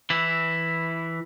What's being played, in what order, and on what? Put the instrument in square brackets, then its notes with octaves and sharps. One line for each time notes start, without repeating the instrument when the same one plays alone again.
[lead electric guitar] E3 E4